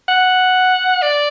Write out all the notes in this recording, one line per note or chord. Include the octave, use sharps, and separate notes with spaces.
F#5
D5